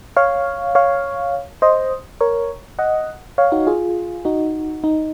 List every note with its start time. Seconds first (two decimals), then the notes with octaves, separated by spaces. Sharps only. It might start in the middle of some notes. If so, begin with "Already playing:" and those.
0.17 C#5 F5
0.75 C#5 F5
1.62 C5 D#5
2.21 A#4 C#5
2.79 D#5 F#5
3.38 C#5 F5
3.52 D#4 F#4
3.67 F4 G#4
4.25 D#4 F#4
4.84 D#4